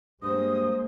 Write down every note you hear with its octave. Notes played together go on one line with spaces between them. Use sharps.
G2 G#3 A#3 C5 D#6